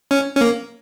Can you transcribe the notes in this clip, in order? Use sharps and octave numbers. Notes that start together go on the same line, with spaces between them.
C#4
C#4
A#3